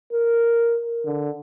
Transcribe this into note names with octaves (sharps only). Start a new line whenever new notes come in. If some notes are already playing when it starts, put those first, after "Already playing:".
A#4
D3